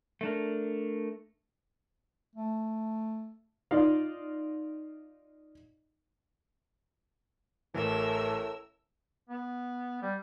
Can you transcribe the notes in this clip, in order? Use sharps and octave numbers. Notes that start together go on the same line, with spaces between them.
A3 D4 A#4
A3
D#4 F4 D5 D#5 F5
A1 A2 E3 A#4 E6
B3
G3